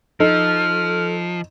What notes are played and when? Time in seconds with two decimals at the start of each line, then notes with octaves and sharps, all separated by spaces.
0.20 F3 D#4 A4 F6